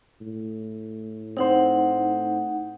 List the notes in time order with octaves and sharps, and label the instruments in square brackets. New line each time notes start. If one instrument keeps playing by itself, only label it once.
[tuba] A2
[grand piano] C4 C5 [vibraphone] D#4 F#5